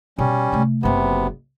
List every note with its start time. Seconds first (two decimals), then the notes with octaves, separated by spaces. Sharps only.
0.18 B2 G3 C#4
0.52 C3 A3
0.83 F#1 C3 A#3 B3